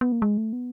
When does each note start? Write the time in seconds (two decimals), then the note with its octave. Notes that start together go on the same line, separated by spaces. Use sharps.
0.01 B3
0.12 A#3
0.22 G#3
0.38 A3
0.53 B3